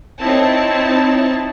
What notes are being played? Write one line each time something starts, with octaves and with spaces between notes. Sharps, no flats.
C4 D#4 E4 C#5 A5